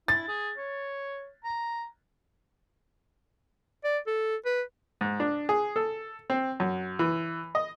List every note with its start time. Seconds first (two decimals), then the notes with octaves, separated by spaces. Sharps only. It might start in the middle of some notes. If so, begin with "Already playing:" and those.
0.08 E4 A6
0.28 G#4
0.57 C#5
1.44 A#5
3.84 D5
4.07 A4
4.45 B4
5.01 G#2
5.20 D4
5.49 G#4
5.76 A4
6.30 C4
6.60 F#2
6.99 E3
7.55 D#5